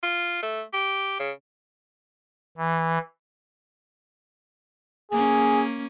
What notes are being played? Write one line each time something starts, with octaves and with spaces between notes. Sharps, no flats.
F4
A3
G4
C#3
E3
A#3 C#4 G#4